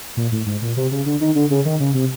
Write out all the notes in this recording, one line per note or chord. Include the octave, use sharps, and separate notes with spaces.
A#2
A2
G#2
A#2
C3
C#3
D3
D#3
D3
C#3
D#3
C#3
C3